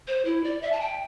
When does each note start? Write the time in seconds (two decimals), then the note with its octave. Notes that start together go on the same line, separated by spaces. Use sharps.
0.07 C5
0.25 E4
0.44 D5
0.62 E5
0.72 A5
0.81 G5